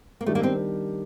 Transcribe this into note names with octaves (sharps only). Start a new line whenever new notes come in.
A#3
D#3 G3 A3 D4 G4 A#4
A#3
C4